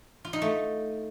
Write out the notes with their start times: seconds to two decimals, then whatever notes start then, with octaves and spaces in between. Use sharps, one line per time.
0.25 F4
0.33 D#4
0.42 A3